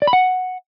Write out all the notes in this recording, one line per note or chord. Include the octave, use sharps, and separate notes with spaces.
D5
B5
F#5